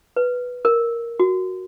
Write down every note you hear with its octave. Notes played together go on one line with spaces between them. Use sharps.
B4
A#4
F#4